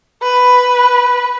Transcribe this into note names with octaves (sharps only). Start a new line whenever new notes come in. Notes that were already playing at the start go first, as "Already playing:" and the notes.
B4